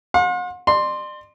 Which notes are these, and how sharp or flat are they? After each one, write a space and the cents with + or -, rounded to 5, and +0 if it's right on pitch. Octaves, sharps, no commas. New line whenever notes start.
F#5 -45 C6 +25
D5 +40 C6 +0